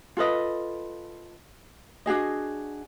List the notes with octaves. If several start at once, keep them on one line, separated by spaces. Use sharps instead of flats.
F4 A4 B4 D#5
D4 F#4 G#4 D#5